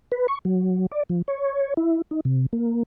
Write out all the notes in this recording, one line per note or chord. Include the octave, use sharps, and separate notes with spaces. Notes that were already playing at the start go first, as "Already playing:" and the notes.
B4
C#6
F#3
D5
F3
C#5
E4
D#4
C3
A#3